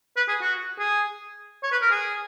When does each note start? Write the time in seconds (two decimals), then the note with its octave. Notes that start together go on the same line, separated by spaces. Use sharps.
0.16 B4
0.28 G#4
0.41 F#4
0.79 G#4
1.63 C#5
1.72 B4
1.82 A#4
1.91 G#4